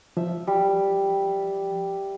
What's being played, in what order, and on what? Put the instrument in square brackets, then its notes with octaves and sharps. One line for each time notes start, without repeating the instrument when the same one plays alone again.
[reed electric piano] F3 [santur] E5
[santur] G3